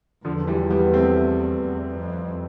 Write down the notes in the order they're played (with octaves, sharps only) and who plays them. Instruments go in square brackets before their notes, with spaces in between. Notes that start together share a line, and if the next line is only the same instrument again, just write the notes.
[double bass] E2 [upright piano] D3 F3
[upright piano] E3 G3
G3 B3
A3 C4
[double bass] E2
F2